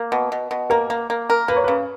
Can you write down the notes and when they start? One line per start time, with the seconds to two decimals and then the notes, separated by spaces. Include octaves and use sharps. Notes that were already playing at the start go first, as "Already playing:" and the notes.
Already playing: A#3
0.12 B2
0.32 B2
0.51 B2
0.70 A#3 A#4
0.90 A#3
1.10 A#3
1.30 A#4
1.48 A#3 B4
1.56 C#5
1.64 B4
1.68 C#3